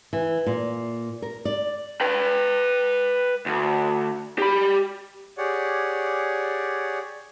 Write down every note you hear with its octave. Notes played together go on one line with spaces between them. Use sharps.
E3
A#2
A#4
D5
B4 G5
D2
G4 B5
G4 G#4 C#5 D5 F#5